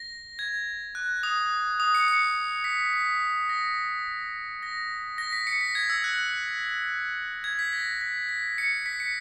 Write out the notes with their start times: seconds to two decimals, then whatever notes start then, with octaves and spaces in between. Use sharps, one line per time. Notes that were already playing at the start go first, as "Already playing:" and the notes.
Already playing: A#6
0.39 G#6
0.95 F#6
1.23 D#6
1.80 D#6
1.95 C#7
2.08 C#7
2.64 B6
2.93 B6
3.49 A#6
4.63 A#6
5.18 A#6
5.33 B6
5.47 C#7
5.61 B6
5.75 G#6
5.90 E6
6.04 F#6
7.44 G#6
7.59 B6
7.73 A#6
8.01 B6
8.29 B6
8.58 C#7
8.86 B6
9.00 C#7